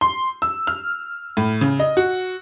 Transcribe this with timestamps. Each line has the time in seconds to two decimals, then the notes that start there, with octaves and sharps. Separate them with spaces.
0.01 C6
0.42 E6
0.67 F6
1.37 A2
1.61 C#3
1.79 D#5
1.97 F#4